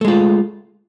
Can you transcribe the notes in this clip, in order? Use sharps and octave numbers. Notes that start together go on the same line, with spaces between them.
G#3 A3 F4